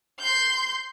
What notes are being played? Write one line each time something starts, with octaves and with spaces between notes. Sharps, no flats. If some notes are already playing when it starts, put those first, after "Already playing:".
C6 G6